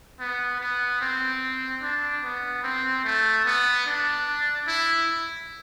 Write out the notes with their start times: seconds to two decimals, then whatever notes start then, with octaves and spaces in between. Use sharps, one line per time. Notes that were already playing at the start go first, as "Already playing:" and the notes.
0.20 B3
0.61 B3
1.01 C4
1.82 D4
2.24 B3
2.64 C4
3.04 A3
3.45 B3
3.86 D4
4.67 E4